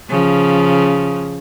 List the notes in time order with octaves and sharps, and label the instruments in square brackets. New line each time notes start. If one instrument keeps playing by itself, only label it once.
[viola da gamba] C#3 F3